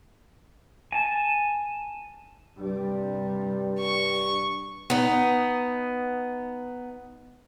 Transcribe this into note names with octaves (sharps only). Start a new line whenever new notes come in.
G#5 A5
G2 C3 G3
C#6
B3 D#4